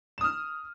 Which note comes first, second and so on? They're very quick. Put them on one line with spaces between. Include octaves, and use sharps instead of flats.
E7 D#6 F6